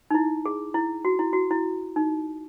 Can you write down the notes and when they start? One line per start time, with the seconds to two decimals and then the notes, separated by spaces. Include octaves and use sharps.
0.11 D#4
0.14 E4
0.46 G#4
0.75 E4
1.05 F#4
1.19 E4
1.33 F#4
1.51 E4
1.96 D#4